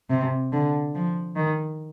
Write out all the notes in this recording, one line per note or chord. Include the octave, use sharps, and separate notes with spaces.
C3
D3
F3
D#3